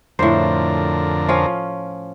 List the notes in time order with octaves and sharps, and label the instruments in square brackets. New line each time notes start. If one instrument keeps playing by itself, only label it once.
[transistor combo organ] F2 D3 A#4 [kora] A2 C5
[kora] F3 C#4 F5